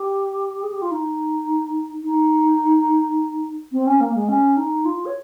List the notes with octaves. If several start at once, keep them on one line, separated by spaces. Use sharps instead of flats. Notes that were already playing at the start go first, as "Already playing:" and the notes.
Already playing: G4
G#4
G4
F4
D#4
D#4
C4
C#4
A#3
G#3
C#4
D#4
F4
C#5